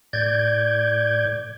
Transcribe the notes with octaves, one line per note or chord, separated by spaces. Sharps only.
A2 D5 G6 G#6